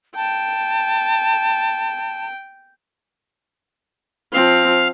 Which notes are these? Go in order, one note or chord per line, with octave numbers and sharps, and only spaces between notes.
G5 A5
F3 C4 F5